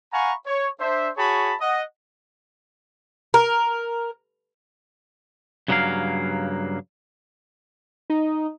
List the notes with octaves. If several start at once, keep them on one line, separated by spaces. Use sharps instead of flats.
F5 F#5 G#5 A#5 B5 C#6
C#5
D4 C5 E5
F#4 G#4 C#5 A5 B5
D#5 F#5
A#4
G2 C#3 F#3 A#3 A#4 F5
D#4